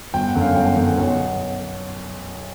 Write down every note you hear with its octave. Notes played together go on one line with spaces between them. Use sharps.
G1 G5
F#5
F#2 D3
F5
G1 G5
G5
F#2 D3 F#5
F#5
B1